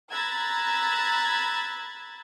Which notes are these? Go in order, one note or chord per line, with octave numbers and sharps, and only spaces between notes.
A#5 B5 E6 F#6 G#6 A6